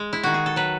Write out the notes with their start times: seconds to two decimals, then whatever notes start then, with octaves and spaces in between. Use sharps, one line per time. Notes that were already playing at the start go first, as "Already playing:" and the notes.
Already playing: G#3
0.13 E4
0.23 D#3 F#4
0.34 G#4
0.46 A4
0.56 F#3 B4